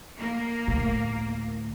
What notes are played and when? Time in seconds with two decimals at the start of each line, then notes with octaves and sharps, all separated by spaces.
0.19 A#3
0.68 D2 A2